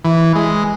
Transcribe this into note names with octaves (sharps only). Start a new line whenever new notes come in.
E3
G#3